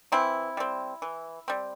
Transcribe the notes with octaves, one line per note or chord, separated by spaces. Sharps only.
E3 C4 E4
G3 C4
E3
G3 C4